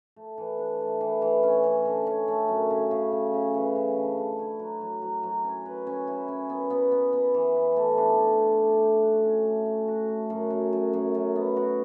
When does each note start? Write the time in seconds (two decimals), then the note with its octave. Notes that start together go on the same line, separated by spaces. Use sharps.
0.16 A3
0.38 E3
0.58 D4
0.80 A3
1.01 E3
1.22 E3
1.43 C#4
1.64 C#4
1.85 D3
2.07 C#4
2.28 A3
2.48 F#2
2.70 C#3
2.91 C#3
3.12 C#3
3.34 C#3
3.54 E3
3.76 C#3
3.96 D3
4.18 D3
4.39 E4
4.59 F#3
4.81 F#3
5.02 F#3
5.23 F#3
5.44 C#4
5.66 B4
5.87 C#4
6.07 E4
6.28 C#4
6.49 B3
6.70 B3
6.91 B3
7.13 B3
7.34 E3
7.55 B3
7.76 A3
7.98 D4
8.18 A3
8.39 G4
8.61 A3
8.83 G4
9.03 F#4
9.24 C#4
9.46 A3
9.66 A3
9.88 F#4
10.08 A3
10.30 F#2
10.50 F#2
10.73 F#2
10.93 F#2
11.14 F#2
11.36 B3
11.56 F#4